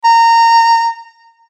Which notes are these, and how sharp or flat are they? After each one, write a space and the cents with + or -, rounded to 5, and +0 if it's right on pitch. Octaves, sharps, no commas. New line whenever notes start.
A#5 -20